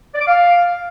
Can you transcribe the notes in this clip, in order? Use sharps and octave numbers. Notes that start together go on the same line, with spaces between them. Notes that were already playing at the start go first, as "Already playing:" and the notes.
D5
D6
F5